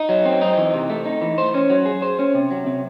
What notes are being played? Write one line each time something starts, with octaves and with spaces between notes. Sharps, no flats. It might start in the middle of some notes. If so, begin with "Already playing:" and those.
Already playing: D#4
F#3
C4
D#4
E3
C3
A3
D#4
E3
C5
C#4
F#3
G#4
C5
C#4
C3
F#3
C3